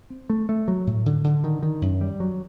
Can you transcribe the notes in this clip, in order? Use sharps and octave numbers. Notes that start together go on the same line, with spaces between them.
C4
A3
A3
F#3
A2
D3
D3
D#3
D#3
F#2
G3
F#3